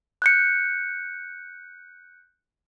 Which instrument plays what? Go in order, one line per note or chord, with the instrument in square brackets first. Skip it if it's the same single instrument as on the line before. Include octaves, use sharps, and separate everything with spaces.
[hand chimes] F#6 G6 C#7